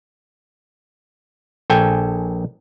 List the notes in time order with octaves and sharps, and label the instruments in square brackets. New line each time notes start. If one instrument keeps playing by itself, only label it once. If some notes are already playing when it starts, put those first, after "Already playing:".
[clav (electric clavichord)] A#1 A4 G5 G#5